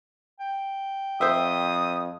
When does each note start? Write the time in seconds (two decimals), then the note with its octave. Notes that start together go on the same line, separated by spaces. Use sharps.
0.40 G5
1.21 F2 C5 E5 D#6